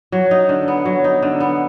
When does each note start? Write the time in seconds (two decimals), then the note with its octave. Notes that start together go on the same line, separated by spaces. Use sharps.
0.12 F#3
0.31 D#4
0.49 D3
0.68 B3
0.85 F#3
1.04 D#4
1.23 D3
1.40 B3